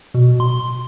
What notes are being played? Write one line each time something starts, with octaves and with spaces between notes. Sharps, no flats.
B2
C6